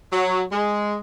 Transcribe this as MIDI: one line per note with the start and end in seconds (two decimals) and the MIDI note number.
0.12 0.42 54
0.52 0.96 56